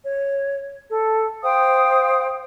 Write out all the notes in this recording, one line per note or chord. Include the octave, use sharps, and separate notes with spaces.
C#5
A4
C5 F5 G5 D#6